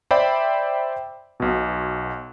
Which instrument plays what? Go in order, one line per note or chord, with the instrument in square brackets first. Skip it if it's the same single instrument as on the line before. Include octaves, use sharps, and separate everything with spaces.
[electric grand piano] C5 D5 E5 G5 B5
B1 B2